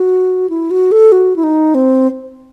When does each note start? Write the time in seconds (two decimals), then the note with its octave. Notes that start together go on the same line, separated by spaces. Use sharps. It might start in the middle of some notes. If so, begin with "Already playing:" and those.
Already playing: F#4
0.50 E4
0.71 F#4
0.92 A4
1.12 F#4
1.36 E4
1.43 D#4
1.75 C4